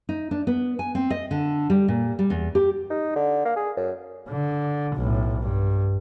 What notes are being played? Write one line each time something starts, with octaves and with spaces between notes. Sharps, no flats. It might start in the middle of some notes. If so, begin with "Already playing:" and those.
D#4
D4
B3
G#5
C4
D#5
D3
G3
A#2
G3
E2
G4
D#4
D3
A#3
G#4
F#2
D3
B1 A2
G2